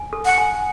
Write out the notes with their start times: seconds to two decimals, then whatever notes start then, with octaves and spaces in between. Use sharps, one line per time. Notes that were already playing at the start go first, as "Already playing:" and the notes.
Already playing: G#5
0.13 A4
0.25 F#5
0.38 G#5